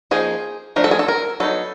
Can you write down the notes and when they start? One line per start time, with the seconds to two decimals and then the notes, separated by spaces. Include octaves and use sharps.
0.11 F3 A#3 D#4 G#4
0.76 F3 A3 D4 A#4
0.84 A4
0.91 G#4
0.99 A4
1.08 A#4
1.40 F#3 B3 D#4 A4